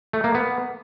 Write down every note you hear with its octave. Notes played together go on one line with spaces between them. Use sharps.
A3
A#3
B3